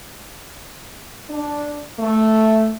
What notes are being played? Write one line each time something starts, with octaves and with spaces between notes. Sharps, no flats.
D4
A3